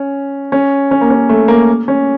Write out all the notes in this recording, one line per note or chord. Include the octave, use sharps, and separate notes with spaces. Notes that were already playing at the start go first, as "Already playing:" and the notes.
Already playing: C#4
C#4
C#4
A#3
C#4
A3
A#3
C#4